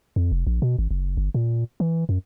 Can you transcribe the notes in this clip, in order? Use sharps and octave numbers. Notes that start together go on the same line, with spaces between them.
F2
F1
A#1
B2
G#1
F#1
G1
A#2
E3
F#2